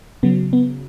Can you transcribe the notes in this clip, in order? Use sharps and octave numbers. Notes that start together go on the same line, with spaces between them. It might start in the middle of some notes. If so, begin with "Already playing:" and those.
C#3 F#3 B3
B3